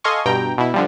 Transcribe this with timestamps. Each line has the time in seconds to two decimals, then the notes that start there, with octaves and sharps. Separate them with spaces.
0.04 A4 D#5 F5 G#5 C6 C#6
0.26 G2 B2 G5 A#5
0.58 B2 E4
0.74 D3 F3 G3